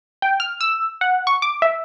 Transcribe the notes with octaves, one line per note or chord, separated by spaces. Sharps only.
G5
F6
E6
F#5
C#6
D6
E5